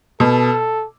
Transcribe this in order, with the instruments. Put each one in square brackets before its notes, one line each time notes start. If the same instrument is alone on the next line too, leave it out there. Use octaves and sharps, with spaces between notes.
[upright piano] B2 [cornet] A4